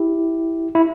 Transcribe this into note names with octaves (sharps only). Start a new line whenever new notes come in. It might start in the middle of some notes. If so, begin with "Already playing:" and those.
Already playing: E4 G4
E4